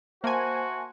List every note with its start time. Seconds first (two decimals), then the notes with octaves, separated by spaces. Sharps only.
0.24 A#3 F#4 C5 E5 G#5 A5 C6